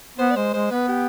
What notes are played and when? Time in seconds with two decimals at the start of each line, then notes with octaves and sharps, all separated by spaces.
0.18 B3 C5
0.31 D5
0.36 G#3 C5
0.54 G#3 C5
0.71 B3 B4
0.88 G4